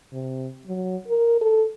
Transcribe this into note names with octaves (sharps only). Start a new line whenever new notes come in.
C3
F#3
A#4
A4